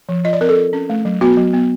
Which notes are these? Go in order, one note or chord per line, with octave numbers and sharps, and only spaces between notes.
F3
F4 D#5
D5
C4 A#4
A4
F4
C#4
A3
F#3
B3 F#4
F#3
B3